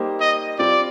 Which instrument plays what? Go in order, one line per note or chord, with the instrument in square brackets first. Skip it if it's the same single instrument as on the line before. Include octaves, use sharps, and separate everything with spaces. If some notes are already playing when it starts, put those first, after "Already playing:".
Already playing: [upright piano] G3 A#3 D#4 G4 C5
[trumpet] D#5
[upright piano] G3 C4 F4 [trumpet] D5